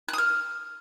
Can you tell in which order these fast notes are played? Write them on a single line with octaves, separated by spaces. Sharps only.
F#6 D#6 F6